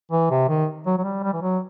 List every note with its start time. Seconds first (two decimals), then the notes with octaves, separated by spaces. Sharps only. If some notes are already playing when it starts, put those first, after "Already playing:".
0.11 E3
0.30 C3
0.49 D#3
0.86 F#3
0.98 F#3
1.04 G3
1.23 G3
1.33 E3
1.42 F#3